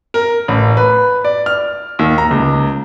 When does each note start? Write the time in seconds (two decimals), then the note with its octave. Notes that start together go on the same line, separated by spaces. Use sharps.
0.14 A#4
0.48 A1
0.77 B4
1.25 D5
1.46 F6
1.99 D#2
2.18 A#5
2.31 C#2